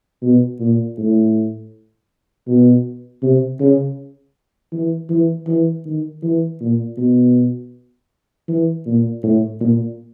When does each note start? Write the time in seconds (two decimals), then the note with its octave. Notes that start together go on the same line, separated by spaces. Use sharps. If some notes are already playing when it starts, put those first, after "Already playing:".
0.22 B2
0.60 A#2
0.98 A2
2.48 B2
3.22 C3
3.60 C#3
4.73 E3
5.10 E3
5.47 E3
5.85 D#3
6.23 E3
6.61 A#2
6.98 B2
8.49 E3
8.86 A#2
9.23 A2
9.61 A#2